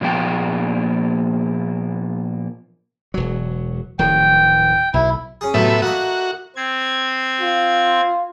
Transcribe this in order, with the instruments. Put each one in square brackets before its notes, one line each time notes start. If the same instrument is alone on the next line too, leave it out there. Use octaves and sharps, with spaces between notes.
[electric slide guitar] A#2 F3 A#3 B3 G5
[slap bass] E1 F#3
[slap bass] D1 D#3 F3 [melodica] G5
[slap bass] B1 [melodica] E4
[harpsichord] C#4 G#4
[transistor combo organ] A2 B3 E5 [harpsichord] C3 F#3
[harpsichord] A3 A#3 D#5 [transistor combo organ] F#4
[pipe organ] C4 G#6
[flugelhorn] F4